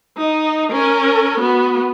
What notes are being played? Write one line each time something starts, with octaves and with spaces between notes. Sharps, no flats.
D#4
C#4 A#4
B3 F#4